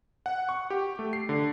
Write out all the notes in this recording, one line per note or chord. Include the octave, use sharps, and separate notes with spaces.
F#5
C#6
G4
A3
C7
D3